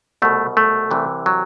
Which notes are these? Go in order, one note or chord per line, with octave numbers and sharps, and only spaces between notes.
C2 B2 F#3 A3
A3
C2 C3 E3
F#3